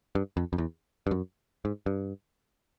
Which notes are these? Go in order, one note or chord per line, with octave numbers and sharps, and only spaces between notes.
G2
F2
F2
E2
G2
F#2
G#2
G2